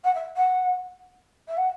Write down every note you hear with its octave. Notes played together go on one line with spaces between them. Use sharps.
F#5
E5
F#5
E5
F#5